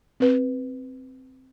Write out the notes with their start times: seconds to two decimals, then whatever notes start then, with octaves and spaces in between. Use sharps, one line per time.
0.20 C4 B4